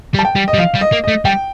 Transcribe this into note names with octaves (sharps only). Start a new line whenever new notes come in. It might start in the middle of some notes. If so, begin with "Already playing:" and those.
G3
A5
G5
G3
D#5
G3
F3 F5
G3
D#5
A#3
A3 D#5
G3 G5